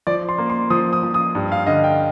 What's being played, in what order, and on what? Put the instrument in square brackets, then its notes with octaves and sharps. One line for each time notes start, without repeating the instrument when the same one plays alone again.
[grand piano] F3 D5
C6
A#3
C6
F3 D#6
D#6
F3
D#6
G2
F5
D3 D#5
G5